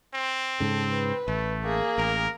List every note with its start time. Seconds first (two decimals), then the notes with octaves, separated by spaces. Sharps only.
0.14 C4
0.60 G#2 C#3 A4
0.92 B4
1.28 A1 A3
1.64 A#3 G#4
1.98 A1 A#4